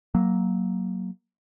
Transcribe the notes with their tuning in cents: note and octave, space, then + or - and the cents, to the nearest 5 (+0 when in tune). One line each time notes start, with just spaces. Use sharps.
F#3 +10 A#3 +0